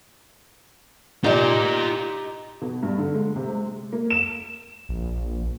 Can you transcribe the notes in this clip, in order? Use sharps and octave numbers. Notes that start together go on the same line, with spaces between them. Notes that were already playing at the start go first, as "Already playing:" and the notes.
D#4 F4 G4 D5
B2
G2
D3
G#3
C3
G#3
A#3
E7
A#1